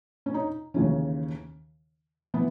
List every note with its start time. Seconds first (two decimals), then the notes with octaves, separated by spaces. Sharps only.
0.26 C#4
0.34 D#4
0.74 D#2 C#3 E3 C#4
2.34 E3 B3